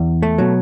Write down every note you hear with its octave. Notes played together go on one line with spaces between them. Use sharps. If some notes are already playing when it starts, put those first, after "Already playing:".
Already playing: E2
A3
B2 F#3